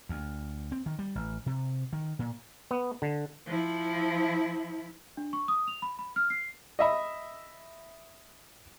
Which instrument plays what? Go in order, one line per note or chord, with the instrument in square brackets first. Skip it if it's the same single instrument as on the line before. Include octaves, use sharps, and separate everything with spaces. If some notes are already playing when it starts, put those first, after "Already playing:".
[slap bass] D2
C4
D#3
G3
A1
C3
D#3
A#2
[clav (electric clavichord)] B3
D3
[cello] F3 E4
[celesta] D4
C#6
D#6
F7
B5
B5
F6
C7
[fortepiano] D#5 E5 B5